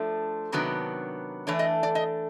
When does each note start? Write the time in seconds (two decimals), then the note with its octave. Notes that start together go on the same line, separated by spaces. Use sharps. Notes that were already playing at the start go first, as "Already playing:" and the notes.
Already playing: F3 A3 D4
0.52 C3 D#3 F#3 B3 D4
1.47 E3 A3 D4 C#5
1.59 D#5
1.83 D5
1.95 D#5